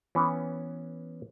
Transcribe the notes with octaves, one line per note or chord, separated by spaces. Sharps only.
E3 B3 C#4